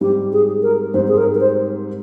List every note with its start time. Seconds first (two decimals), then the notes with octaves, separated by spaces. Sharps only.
0.01 G#2 G3 C4 G4
0.32 G#4
0.62 A#4
0.93 G#2 G3 C4 C5
1.07 G#4
1.17 A#4
1.34 A#4
1.40 C5